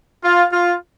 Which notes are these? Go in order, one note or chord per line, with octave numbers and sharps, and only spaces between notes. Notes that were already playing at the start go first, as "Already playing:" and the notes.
F4
F4